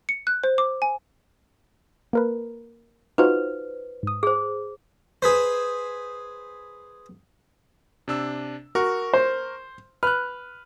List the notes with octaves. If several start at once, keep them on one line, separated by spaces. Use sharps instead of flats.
C#7
F#6
C5
D6
G#5
A#3 A#4 B4
D#4 F4 F#4 B4 C5
G#2 D#6
G#4 C5
G#4 B4 C5
C3 D4 E6
F#4 A#4 C#6
C5
B4 F6 F#6